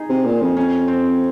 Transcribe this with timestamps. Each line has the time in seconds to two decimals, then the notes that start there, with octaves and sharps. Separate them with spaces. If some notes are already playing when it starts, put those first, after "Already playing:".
Already playing: D#4 G#4
0.09 C3
0.25 A#2
0.41 F2
0.57 F2 C#4
0.88 C4